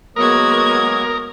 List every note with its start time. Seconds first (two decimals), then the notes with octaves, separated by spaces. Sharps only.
0.16 F#3 G#3 A#3 B3 F#4 A#4 D#6 G#6